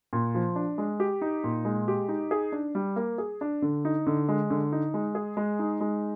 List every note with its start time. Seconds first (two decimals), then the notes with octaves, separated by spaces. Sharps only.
0.13 A#2
0.35 F3
0.56 D4
0.78 G#3
1.00 G4
1.22 D#4
1.44 A#2
1.65 G#3
1.88 G4
2.09 D#4
2.31 G#4
2.52 D4
2.75 G3
2.96 A#3
3.18 G#4
3.41 D4
3.62 D3
3.85 D#4
4.07 D3
4.29 G#3
4.50 D3
4.72 D#4
4.94 G#3
5.15 G#4
5.37 G#3
5.59 D#4
5.81 G#3